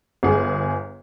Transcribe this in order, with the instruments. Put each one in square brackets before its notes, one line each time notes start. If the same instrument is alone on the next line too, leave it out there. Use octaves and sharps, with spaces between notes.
[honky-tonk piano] G1 G#4